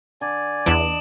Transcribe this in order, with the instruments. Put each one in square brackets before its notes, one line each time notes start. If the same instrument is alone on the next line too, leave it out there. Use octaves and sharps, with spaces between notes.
[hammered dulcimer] D3 [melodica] D5 G#5
[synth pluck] E2 E3 [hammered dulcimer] D4 D#5 [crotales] D7 E7 F#7